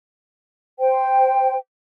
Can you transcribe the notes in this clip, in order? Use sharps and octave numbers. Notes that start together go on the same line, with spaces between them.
C5 G5